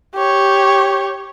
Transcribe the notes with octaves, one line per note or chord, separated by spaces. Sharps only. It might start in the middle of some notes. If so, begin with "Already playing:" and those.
G4 C#5